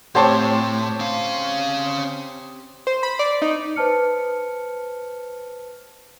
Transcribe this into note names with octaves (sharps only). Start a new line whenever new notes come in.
A2 C4 G4 C5 C#5 A5 C6
C#4 F5
C5
B5
D5
D#4
B4 C5 A5 F6 C#7